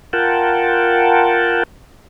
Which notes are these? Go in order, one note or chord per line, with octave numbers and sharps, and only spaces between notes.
F4 A#4 F#5 G5 A5